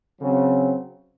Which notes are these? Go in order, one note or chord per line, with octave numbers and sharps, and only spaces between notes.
C#3 F#3 C4